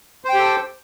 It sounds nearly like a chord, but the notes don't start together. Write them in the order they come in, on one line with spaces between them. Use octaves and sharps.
C5 G5 G4 A4